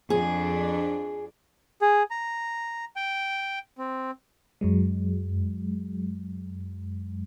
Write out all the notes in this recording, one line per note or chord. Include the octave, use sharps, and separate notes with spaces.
F2 D4 G#4
G#4
A#5
G5
C4
F#2 F#3 G#3